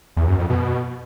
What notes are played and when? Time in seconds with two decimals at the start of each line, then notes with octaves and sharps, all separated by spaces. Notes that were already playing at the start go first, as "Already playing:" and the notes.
0.16 E2
0.27 F#2
0.38 F2
0.49 B2